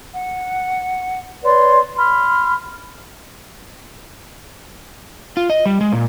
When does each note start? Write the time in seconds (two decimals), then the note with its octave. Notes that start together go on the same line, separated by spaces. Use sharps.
0.15 F#5
1.44 B4 C#5 D5 C6
1.98 B5 C6 F6
5.37 F4
5.50 D#5
5.66 G3
5.81 G#3
5.92 A#2